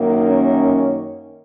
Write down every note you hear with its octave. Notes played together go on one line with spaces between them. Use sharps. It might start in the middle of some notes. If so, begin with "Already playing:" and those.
Already playing: F#2 D#3 A#3
C#4